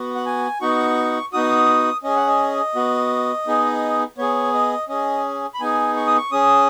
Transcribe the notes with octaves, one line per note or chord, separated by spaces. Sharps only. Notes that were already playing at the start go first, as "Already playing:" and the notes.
Already playing: B3 F#4
F#5
G#5
B3 D#4 F#4 C#6
B3 D#4 F#4 D#6
C#4 G#4 D#5
F#5
D#5
B3 F#4
B3 D#4 G#4
B3 G#4 C#5
D#5
C#4 G#4 D#5
B5
B3 D#4 G#4 G#5
C#6
D#6
C#6
C#4 G#4 D#6